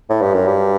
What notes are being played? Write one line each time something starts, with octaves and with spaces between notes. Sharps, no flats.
A2
G2
F#2
G2